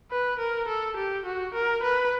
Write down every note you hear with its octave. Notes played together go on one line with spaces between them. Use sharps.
B4
A#4
A4
G4
F#4
A#4
B4